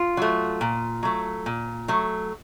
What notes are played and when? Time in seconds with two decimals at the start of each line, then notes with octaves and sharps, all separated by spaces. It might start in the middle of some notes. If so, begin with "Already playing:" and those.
Already playing: F4
0.17 F#3 A3
0.61 A#2
1.03 F#3 A3
1.46 A#2
1.88 F#3 A3